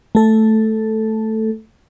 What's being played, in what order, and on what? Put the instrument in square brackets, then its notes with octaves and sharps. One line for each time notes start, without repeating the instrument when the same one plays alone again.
[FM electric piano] A3 A4